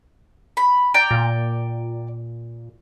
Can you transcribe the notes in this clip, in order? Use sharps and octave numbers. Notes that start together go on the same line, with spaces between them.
B5
D5 G5 A#5
A#2